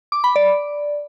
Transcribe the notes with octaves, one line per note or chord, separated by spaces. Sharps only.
D6
B5
D5